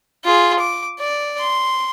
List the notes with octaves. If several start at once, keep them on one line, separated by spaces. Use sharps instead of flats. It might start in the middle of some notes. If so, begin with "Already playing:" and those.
F4 G#4
D6
D5
C6